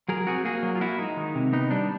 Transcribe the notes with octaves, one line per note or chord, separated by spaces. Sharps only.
F#3 G#4 A#4
C4 F#4 G#4
A#3 F#4 G#4
F#3
F4
A#3 E4 F#4
G#3 D#4
D#3
C3
B3 D#4
G3 D4